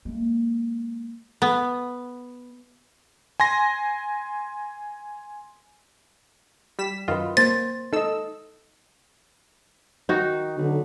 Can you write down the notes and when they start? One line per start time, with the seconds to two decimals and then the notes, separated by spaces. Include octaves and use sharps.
0.05 G#3 A#3
1.42 B3
3.40 G#5 C6 A#6
6.79 G3 B6 E7
7.08 F#2 D#3 F4 B4 D#5
7.37 A#3 C5 A6
7.93 D#4 A4 D#5 E6
10.09 D#3 D#4 F#4
10.57 B1 D3